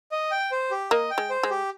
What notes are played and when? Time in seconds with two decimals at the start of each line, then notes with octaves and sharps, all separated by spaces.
0.12 D#5
0.31 G5
0.52 C5
0.71 G4
0.91 A#3 D#5
1.11 G5
1.18 G#3
1.30 C5
1.43 G#3
1.50 G4